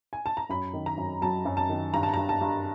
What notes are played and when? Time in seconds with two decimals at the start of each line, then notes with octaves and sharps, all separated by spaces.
0.13 G#5
0.26 A5
0.37 A#5
0.49 F#2 B5
0.73 D#3
0.86 A#5
0.98 F#2
1.22 F#3 A5
1.45 F#2
1.57 A5
1.69 D#3
1.93 G2 A#5
2.03 A5
2.14 G2 A#5
2.29 A5
2.41 G2